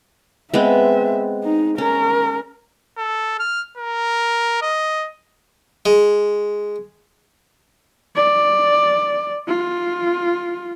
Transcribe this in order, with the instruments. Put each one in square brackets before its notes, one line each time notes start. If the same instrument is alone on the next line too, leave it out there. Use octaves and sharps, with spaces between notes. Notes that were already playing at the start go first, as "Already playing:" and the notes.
[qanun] G#3 B3 C4 [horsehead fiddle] E5
[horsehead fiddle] D#4
[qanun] C#4 [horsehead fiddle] A#4
[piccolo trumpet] A4
F6
A#4
D#5
[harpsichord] G#3
[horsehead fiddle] D5
F4